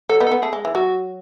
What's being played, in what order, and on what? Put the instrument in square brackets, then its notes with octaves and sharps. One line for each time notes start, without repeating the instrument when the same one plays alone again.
[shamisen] F#3 [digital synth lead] A4
[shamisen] B3 D#4
[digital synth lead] A4
[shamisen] B3
[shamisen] A3 [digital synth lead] G#4
[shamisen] G#3
E3
[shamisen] F#3 [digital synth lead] F#4